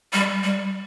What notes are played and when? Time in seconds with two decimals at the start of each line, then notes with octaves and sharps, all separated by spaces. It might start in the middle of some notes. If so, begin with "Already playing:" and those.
0.13 G3
0.44 G3